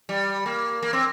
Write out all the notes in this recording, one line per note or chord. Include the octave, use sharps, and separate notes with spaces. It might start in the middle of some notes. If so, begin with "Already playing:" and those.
G3
A#3
A#3
C4